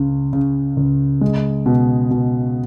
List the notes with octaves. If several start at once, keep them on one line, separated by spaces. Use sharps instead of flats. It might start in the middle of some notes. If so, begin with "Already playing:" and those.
Already playing: C#2 C#3
C#3
C#2
G#3
B2
B2